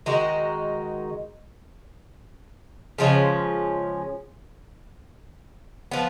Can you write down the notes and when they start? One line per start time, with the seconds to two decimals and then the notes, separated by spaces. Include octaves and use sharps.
0.06 D#3 G#3 D#4 F#4
2.98 C#3 F3 G#3 C#4
5.91 F3 B3